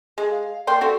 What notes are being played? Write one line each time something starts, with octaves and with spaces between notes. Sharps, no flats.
G#3 G#4
F5
A#3 D5 G5 C6
C4 F#4 G4 A4